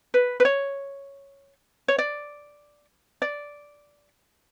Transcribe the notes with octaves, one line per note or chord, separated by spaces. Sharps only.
B4
B4
C#5
C#5
D5
D5